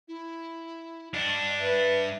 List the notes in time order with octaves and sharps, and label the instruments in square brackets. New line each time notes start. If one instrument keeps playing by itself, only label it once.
[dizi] E4
[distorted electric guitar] G2 D4 [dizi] D#5
[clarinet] B4 [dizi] E5